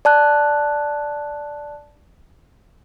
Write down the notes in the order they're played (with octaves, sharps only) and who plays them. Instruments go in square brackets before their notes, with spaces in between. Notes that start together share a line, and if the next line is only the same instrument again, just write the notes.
[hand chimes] D5 A5 F#6